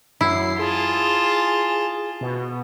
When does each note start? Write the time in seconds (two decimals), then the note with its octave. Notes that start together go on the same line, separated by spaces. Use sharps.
0.21 F#2 E4 C7
0.59 F4 G#4 A5
2.21 B2